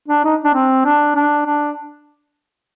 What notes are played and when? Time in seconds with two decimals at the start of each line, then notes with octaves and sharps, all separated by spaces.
0.08 D4
0.24 D#4
0.44 D4
0.54 C4
0.85 D4
1.15 D4
1.46 D4